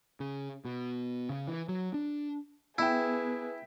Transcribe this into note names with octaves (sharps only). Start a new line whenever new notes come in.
C#3
B2
C#3
E3
F#3
D4
B3 E4 G#4 B4 E5 G5